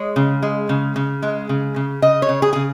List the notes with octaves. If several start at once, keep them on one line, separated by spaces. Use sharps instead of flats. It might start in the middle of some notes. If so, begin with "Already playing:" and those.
Already playing: G#3 C#5
C#3
G#3
C#3
C#3
G#3
C#3
C#3
C#3 D#5
C#5
C#3
G#4
C#3 G#4